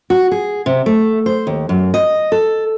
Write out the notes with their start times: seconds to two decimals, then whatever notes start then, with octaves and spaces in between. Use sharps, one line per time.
0.10 F#4
0.32 G#4
0.66 C3
0.86 A3
1.26 C5
1.47 D#2
1.69 F#2
1.94 D#5
2.32 A4